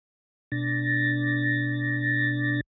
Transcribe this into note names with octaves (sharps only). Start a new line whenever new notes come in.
B2 D4 A6 A#6